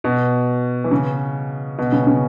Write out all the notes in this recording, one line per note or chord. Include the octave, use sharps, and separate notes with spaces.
B2
E3
C#3
B2
C#3
C#3